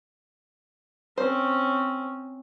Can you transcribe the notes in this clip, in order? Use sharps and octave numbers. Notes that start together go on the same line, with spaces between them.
C4 C#4 C5